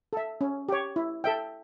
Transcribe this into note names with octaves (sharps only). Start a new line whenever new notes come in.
A4 E5
C#4
G4 C#5
E4
A4 E5 G5